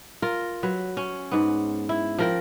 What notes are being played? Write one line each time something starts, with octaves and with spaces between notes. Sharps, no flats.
F4 A#4
F#3 B4
C#4
G#2 B3
E4
F3 A#4 G5